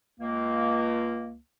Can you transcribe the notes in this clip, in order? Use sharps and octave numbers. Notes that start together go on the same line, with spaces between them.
C#2 A#3